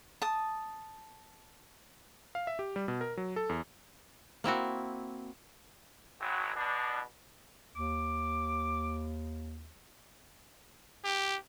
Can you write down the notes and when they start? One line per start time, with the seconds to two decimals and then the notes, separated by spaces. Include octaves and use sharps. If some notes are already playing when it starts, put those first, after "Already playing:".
0.22 A5 D#6
2.35 F5
2.47 E5
2.59 G4
2.76 G3
2.88 B2
3.01 A#4
3.17 F#3
3.36 A4
3.49 E2
4.44 A#3 C4 E4 F#4
6.21 G#1 F#3
6.56 B2 D4
7.76 D#2 D6
11.04 G4